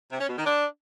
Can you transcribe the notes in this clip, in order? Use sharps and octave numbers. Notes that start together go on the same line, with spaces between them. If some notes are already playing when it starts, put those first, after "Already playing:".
C3
C#4
B2
D#3
D4